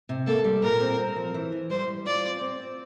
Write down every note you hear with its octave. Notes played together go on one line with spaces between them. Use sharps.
C3
A#3 A4
G3
A#2 A#4
C4
C4
F3
E3
E3
G3 C5
G3
F4 D5
C4
C4
C4